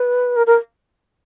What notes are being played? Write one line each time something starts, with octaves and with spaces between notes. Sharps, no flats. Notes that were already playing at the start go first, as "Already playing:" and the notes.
Already playing: B4
A#4
A#4